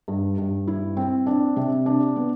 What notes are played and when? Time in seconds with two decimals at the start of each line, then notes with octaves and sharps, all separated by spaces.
0.08 G2
0.38 G2
0.68 E4
0.97 C4
1.26 D4
1.56 C3
1.86 D4
2.16 B3